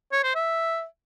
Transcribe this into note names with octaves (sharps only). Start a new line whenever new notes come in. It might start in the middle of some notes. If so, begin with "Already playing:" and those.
C#5
C5
E5